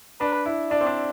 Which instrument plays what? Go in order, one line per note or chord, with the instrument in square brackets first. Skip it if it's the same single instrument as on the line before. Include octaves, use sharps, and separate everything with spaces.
[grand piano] D4 [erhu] B4
[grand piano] E4
[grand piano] D4 [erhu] D5
[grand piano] C4
D4